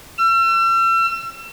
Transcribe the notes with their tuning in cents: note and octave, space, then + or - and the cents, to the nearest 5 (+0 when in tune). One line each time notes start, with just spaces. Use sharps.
E6 +40